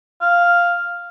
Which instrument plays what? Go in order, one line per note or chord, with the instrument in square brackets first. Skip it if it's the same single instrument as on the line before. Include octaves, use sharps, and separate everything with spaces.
[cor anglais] F5